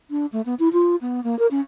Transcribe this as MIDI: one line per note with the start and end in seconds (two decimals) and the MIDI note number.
0.11 0.26 62
0.32 0.42 57
0.46 0.55 59
0.60 0.69 64
0.73 0.96 65
1.01 1.23 59
1.24 1.38 58
1.39 1.47 70
1.51 1.61 61